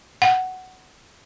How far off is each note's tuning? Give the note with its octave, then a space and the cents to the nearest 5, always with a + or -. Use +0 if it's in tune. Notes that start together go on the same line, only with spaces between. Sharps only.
F#5 +10